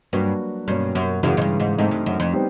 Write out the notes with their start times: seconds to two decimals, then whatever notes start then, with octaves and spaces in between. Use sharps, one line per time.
0.13 G2 F#3 A#3 D4 F#4 B4
0.68 G2 B2 F#3 A#3 C#4
0.95 F#2
1.23 F#2 C#3 E3 G#3
1.37 G#2
1.41 G2
1.60 G#2
1.78 G#2 A3 C4 D#4
1.91 G2
2.06 F#2
2.20 F2
2.33 G3 B3 D#4 G4 C5